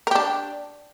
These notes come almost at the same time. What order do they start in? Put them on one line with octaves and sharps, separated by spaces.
A#4 G4 D4